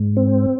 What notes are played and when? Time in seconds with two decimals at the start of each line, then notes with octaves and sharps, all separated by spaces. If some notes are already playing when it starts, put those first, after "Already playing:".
Already playing: G#2
0.16 C4